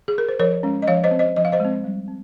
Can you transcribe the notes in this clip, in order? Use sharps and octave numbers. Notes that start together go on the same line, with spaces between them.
G#4
A#4
C5
F3 A#4 C#5
G#3 C#4
D#5
F3 C#5 F5
C5 D#5
C4
C5 D#5
F3 D#5
F5
C5 D#5
G#3 C4
G3
C4